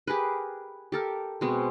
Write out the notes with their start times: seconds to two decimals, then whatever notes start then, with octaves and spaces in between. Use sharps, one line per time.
0.07 G4 G#4 A#4 B4
0.92 G4 A4 A#4
1.41 B2 G#3 C4